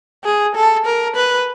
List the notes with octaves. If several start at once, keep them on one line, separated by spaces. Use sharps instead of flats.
G#4
A4
A#4
B4